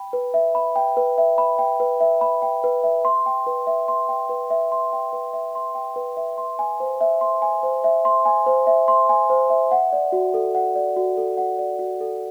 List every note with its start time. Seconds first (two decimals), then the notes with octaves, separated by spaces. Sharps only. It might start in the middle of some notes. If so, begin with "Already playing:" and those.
Already playing: G5 B5
0.13 B4
0.34 E5
0.55 B5
0.76 G5
0.97 B4
1.18 E5
1.38 B5
1.59 G5
1.80 B4
2.00 E5
2.21 B5
2.42 G5
2.64 B4
2.84 E5
3.05 C6
3.26 G5
3.47 B4
3.67 E5
3.88 C6
4.09 G5
4.29 B4
4.50 E5
4.72 C6
4.93 G5
5.13 B4
5.33 E5
5.55 C6
5.75 G5
5.96 B4
6.17 E5
6.38 C6
6.59 G#5
6.80 C5
7.01 E5
7.21 C6
7.42 G#5
7.63 C5
7.84 E5
8.05 C6
8.25 G#5
8.46 C5
8.67 E5
8.88 C6
9.09 G#5
9.30 C5
9.50 E5
9.71 F#5
9.93 D5
10.12 F#4
10.34 A4
10.55 F#5
10.75 D5
10.96 F#4
11.17 A4
11.37 F#5
11.59 D5
11.79 F#4
12.01 A4